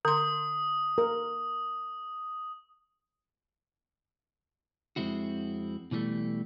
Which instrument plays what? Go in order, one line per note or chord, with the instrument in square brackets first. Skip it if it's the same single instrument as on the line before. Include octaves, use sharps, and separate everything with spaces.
[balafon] D3 C6 [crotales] D#6
[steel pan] A#4
[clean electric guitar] F2 A#2 G#3 C4 E4 F#4
B2 E3 F3 G3 A3